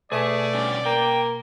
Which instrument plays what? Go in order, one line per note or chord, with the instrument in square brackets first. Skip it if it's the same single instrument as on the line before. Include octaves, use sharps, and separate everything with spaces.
[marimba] B2 [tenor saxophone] A3 [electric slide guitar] G#4 [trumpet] D5
[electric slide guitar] D3 G3 C#4
[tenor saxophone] A#3 [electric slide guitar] G5